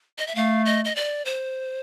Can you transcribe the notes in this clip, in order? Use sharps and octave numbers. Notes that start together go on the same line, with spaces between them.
D#5
E5
A3 F5
D#5
D#5
D5
C5